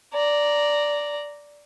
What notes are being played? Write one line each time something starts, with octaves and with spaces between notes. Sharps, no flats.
D5 A#5